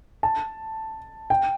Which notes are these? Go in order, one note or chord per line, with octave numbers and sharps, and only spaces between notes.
A5
G5